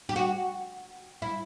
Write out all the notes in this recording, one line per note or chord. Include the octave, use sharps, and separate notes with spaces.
G4
F#4
E4